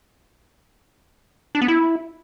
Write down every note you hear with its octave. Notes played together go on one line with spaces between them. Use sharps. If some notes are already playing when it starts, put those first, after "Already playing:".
D4
B3
E4